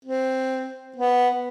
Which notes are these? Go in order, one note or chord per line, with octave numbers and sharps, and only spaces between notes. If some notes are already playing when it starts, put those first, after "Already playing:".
C4
B3